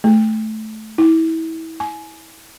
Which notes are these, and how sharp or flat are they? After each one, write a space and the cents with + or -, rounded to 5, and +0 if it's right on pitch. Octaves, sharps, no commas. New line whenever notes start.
A3 -15
E4 -30
G#5 +20